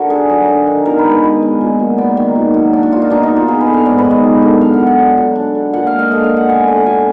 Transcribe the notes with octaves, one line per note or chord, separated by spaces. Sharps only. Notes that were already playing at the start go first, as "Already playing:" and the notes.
Already playing: D3 F#4 A#4
D4 G#4
F#3
D4
D#3
B2 A#4
B4
G#3
B4
B2 B4
G#3
A#2
F#3
B3 D5
D#3
A#2
F#3
D4 D5
F#4
F#3 F4
D#4
B2 D4
D#4
A#3
F4
B3 G#4
B4
D3
F5
G#2 D5
B4
D#3
D#5
F#2
D3
D4 F5
F#5
F#3
F#5
D4
F#3
D4
D3
A#2 F#5
F5
G#3
D#5
D3 F5
F5
G#3
F#5
B3 G#5
D3 F#5
B2 G#5